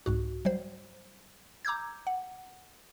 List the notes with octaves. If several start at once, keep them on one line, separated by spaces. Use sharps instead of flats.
C2 G#2 F#4
F#3 G3 C5
A#5 D6 E6 G6 G#6
F#5